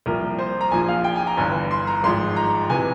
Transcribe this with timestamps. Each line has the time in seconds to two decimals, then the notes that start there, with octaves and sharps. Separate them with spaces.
0.06 C2 A#2 F3 A#4
0.39 C5
0.61 A#5
0.71 A#1 A#2 F3 G#5
0.88 F5
1.04 G5
1.16 G#5
1.27 A#5
1.37 G1 G2 E3 G#5
1.71 C6
1.87 A#5
2.04 G#1 G#2 F3 C6
2.36 A#5
2.70 C3 E3 G#5